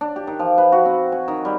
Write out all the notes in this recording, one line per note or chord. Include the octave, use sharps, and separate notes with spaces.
D4
G4
D#3
F3
B4
F#4
C4
G#5
D#3
G3